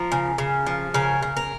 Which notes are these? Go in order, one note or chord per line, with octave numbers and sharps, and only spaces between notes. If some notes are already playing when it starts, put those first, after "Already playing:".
Already playing: F3 A#4
C#3
C#3
F3
C#3 A#4
C#3
A#4